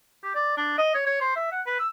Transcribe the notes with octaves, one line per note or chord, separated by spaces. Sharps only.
G4
D5
D4
D#5
C#5
C#5
C5
E5
F#5
B4
E6